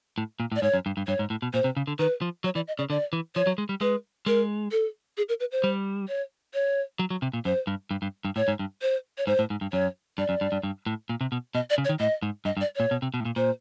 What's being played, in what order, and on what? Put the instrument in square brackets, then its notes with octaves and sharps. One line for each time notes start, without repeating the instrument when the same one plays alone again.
[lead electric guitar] A2
A#2
A2
[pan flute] D5
[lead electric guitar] G#2 [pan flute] C#5
[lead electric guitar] F#2
G2
G2
[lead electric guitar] G2 [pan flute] C#5
[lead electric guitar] G#2
A2
B2
[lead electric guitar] A#2 [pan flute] C5
[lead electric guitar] C3
C#3
D3
[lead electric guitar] D#3 [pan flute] B4
[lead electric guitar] F3
[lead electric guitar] F#3 [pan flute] C#5
[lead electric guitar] E3 [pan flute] D5
[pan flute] D#5
[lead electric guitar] C#3 [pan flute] D5
[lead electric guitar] D3 [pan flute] D5
[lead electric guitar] E3
[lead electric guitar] F3 [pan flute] C#5
[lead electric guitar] F#3
G#3
G3
[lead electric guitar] G#3 [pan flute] B4
[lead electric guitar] G#3 [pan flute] A#4
[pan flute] A4
G#4
A#4
B4
C5
[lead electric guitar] G3
[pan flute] C#5
C#5
[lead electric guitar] F#3
F#3
C3
A#2
[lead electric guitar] F#2 [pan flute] C5
[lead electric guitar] G2
G2
G2
G2
[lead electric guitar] A2 [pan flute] C#5
[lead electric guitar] G#2
G2
[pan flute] C5
C#5
[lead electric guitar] G#2 [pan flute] C5
[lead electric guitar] A2
G#2
G2
[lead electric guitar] F#2 [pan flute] C#5
[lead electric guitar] G2 [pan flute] D5
[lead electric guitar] F#2
G2
G2
G2
A2
A#2
C3
B2
[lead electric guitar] B2 [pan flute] D#5
[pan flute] D5
[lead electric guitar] C#3
[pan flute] C#5
[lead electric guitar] D#3
[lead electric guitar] A2 [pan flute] D#5
[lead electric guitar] G#2
[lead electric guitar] G2 [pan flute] D#5
[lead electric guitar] G2
[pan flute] D5
[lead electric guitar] A#2 [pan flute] C#5
[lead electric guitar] B2
C3
B2
A2
A#2
[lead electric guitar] A#2 [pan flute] C5